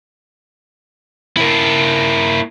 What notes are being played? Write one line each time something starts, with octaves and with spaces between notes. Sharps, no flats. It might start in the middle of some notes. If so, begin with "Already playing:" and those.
A#3 E4